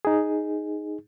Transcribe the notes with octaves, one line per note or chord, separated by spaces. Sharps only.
D#4 G#4